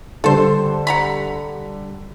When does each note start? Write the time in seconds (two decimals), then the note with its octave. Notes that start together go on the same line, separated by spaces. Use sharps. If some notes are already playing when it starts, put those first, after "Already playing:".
0.24 D3 G3 A4 C5
0.87 F#5 A#5 B5